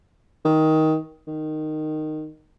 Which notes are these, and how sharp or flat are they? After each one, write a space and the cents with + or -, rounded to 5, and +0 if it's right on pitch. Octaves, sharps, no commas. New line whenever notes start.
D#3 +15
D#3 -10